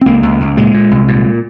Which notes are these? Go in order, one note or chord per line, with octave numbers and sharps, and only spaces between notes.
C4
C#2 A#3
C#2
C#2
A#2 G#3
A#2
C2
A#2